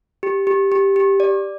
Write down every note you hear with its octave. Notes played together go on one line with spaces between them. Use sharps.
G4
G4
G4
G4
D5